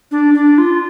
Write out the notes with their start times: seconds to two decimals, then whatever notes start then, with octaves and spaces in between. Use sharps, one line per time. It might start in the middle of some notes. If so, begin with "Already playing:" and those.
0.11 D4
0.34 D4
0.58 F4